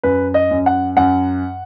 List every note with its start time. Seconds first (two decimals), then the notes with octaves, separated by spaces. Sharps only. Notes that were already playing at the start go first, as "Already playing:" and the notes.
0.03 F#2 B4
0.34 D#5
0.51 F#2
0.66 F#5
0.97 F#2 F#5